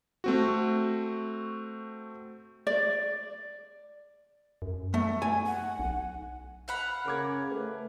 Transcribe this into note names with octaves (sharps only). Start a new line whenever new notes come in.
A3 C4 F#4
D5
F#2
A3
G#5
F#5
B1
F5 F#5 B5
C#3 A#4 D6 G#6
A3 B4